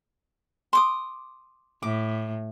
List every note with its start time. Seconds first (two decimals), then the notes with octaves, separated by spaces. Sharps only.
0.73 C6 D6 D#6
1.83 A2 D6